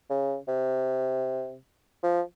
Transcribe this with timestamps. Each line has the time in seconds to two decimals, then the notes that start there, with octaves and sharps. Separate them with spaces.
0.10 C#3
0.48 C3
2.03 F3